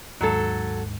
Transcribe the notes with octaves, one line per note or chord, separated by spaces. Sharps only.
D#2 G#2 F#3 A4